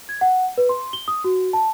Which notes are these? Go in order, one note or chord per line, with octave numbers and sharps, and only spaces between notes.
G#6
F#5
B4
C6
G7
D#6
F#4
A5